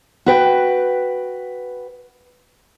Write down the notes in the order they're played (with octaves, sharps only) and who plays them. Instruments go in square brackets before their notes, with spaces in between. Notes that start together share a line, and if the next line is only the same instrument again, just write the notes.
[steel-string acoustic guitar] F#4 B4 G5